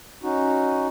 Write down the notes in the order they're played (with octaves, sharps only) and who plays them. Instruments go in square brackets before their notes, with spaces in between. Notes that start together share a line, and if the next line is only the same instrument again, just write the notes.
[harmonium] C#4 D#4 F#4